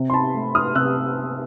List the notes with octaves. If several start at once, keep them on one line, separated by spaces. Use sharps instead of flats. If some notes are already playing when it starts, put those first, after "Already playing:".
Already playing: C3
C6
A5 B5
A3
D#6 F6
C3 E6 F#6